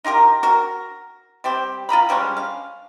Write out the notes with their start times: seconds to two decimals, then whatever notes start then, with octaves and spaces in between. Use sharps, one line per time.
0.04 D#4 F4 G4 A#4
0.43 F#4 A#4
1.44 G3 C4 G4
1.89 F4 D#5 A#5 B5
2.09 F3 G3 G#3 C#4
2.37 F5